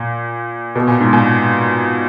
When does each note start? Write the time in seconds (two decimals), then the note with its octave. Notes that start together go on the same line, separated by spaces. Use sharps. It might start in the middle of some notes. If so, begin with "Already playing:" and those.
Already playing: A#2
0.76 B2
0.88 A#2
1.01 G#2
1.13 A#2